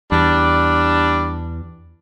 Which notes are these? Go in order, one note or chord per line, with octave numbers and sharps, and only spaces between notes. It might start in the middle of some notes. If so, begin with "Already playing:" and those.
E2 G3 D4